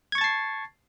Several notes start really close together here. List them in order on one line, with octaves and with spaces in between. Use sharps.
G#6 C#6 A6 A5 C7